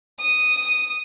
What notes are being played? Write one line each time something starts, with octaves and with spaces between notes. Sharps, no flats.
D#6